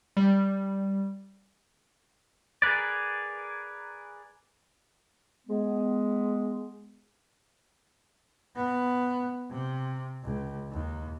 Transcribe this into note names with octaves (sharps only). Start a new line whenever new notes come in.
G3
G#4 A#4 B4 D5
G#3 B3
B3
C3
C#2
D#2